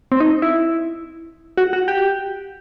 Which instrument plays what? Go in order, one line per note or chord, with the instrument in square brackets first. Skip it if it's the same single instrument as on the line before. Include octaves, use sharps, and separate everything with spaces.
[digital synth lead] C4
D#4
E4
F#4
F#4
G4